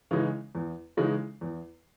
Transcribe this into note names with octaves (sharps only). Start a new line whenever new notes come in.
C#3 E3 G#3 D#4
E2
C#3 E3 G#3 D#4
E2